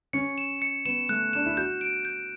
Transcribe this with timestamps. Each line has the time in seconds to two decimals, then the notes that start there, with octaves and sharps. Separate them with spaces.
0.13 C#4 C#7
0.38 E7
0.62 C#7
0.85 B3 E7
1.09 A3 F#6
1.33 D4 E7
1.46 E4
1.57 F#4 G6
1.81 D7
2.05 G6